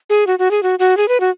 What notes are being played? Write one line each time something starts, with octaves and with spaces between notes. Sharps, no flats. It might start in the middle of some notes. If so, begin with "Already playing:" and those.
G#4
F#4
F#4
G#4
F#4
F#4
G#4
B4
F#4